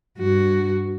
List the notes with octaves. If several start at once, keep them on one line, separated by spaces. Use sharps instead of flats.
G2 F#4